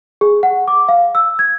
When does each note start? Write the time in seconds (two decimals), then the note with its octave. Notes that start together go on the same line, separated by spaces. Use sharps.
0.21 G#4
0.43 F#5
0.68 D6
0.88 F5
1.15 E6
1.39 G#6